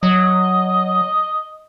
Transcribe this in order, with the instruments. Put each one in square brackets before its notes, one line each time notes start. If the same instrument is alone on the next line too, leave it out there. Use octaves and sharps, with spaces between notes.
[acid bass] F#3 [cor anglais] D#5